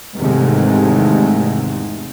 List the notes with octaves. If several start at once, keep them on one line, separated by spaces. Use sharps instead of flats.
E2 G#2 C3 D#3 G#3 A3